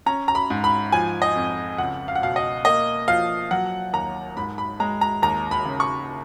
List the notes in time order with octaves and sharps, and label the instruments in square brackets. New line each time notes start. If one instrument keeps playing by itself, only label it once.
[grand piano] C#4 A#5
A#5
B5
G#2
B5
F3 G#5
D#5
F2
C#2 F#5
F5
F#5
B2 F5
D#5
A#3 D#5
F3 F5
F#3 F#5
D#2 A#5
G#2 B5
B5
G#3 A#5
A#5
D#2 A#5
B5
C#3
C#6